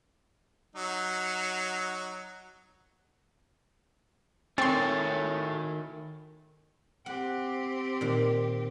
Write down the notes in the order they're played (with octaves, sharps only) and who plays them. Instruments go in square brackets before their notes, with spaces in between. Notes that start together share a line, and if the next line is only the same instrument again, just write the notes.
[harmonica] F#3 D#4
[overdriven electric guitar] D#3 G#4 [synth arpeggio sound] C4 C6 [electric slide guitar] E4 A4 C#5 [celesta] A6
[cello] C4 G4 [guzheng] F#5
[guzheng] A#2 D#3